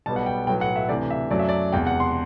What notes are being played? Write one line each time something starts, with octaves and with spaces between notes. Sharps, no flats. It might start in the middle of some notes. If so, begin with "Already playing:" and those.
B1 B2 G3 B3 A5
F#5
G5
B1 A2 F#3 B3 G5
F#5
E5
D2 C3 E3 D5
E5
F#2 F#3 A3 D5
E5
D5
E1 E2 C3 G5
F#5
C6